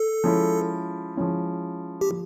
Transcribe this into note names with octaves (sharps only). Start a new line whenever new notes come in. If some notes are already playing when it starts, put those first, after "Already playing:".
Already playing: A4
F3 G#3 C#4 E4
F3 G#3 C#4 E4
G4
F3